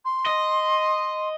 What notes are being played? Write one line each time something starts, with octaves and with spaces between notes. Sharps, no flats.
C6
D#5